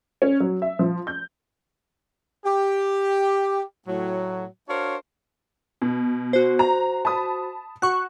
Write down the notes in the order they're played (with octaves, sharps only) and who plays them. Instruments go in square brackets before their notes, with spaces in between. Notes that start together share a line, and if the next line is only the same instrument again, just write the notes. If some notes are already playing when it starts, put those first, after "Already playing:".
[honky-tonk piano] C#4
F#3
E5
F3
G6
[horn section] G4
A2 F#3
D4 F#4 A#4 C5 C#5 F5
[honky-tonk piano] B2
[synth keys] F#4 C5
[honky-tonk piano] A#5
A5 B5 D#6
[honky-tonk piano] F#4 [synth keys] C#6 F#6